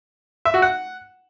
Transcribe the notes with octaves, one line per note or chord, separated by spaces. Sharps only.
E5
F#4
F#5